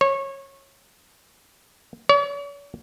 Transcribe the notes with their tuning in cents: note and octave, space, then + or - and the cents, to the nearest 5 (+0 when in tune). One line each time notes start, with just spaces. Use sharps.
C#5 -20
C#5 +45